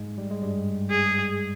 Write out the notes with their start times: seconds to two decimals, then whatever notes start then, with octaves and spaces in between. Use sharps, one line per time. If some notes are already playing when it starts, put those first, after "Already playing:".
Already playing: G#2 G#3
0.18 G3
0.31 G#3
0.42 G2 G3
0.90 G#4